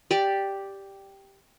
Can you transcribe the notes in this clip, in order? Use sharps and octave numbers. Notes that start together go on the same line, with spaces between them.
G4 D5